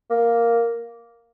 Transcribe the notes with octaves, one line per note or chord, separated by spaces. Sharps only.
A#3